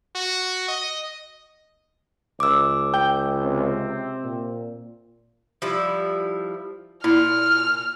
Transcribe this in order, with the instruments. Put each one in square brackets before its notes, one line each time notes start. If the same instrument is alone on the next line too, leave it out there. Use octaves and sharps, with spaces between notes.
[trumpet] F#4
D#5
[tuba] C#2 [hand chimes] D6 E6
[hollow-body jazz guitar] G5
[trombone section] C3 C4
[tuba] A#2
[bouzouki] F3 G3 E4
[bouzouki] A#2 [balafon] E4 [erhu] F6